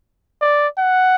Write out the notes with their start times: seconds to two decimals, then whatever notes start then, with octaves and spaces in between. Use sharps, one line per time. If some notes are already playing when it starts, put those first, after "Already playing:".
0.42 D5
0.79 F#5